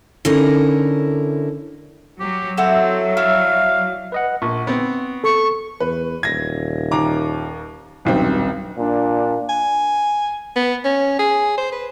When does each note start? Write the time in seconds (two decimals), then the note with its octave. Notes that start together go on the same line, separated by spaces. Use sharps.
0.25 D3 C#4 D#4 E4 A#4
2.20 F#3 G4
2.57 F#3 C4 E4 F#4 A4
3.17 D4 E4 F5
4.12 B4 D#5 F#5
4.42 A#1 C#6
4.67 B3 C4
5.24 A4 C#6
5.80 E2 B4
6.23 D#1 G#6 A#6
6.91 D#2 A#5 D6
8.05 D#1 B1 G2 C4
8.78 A#2 D4
9.49 G#5
10.56 B3
10.84 C#4
11.19 G#4
11.58 C5
11.72 B4